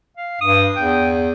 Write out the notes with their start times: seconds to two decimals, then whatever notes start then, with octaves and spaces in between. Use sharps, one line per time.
0.17 F5
0.41 G2 D#6
0.76 E2 G5